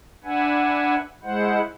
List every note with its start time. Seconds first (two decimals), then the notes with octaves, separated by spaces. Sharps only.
0.24 D4 B4 E5 F#5 G#5
1.23 G#3 E4 C5 F#5